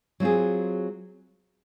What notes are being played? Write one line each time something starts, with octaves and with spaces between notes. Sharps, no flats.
F#3 C4 F4 G#4